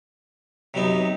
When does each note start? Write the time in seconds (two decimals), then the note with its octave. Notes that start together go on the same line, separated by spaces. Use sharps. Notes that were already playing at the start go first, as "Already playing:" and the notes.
0.74 C3 F#3 B3 D#4